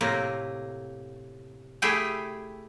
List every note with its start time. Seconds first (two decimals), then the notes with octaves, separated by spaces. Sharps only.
0.01 A2 C3 A#3
1.82 A3 E4 G4 G#4 E5 G5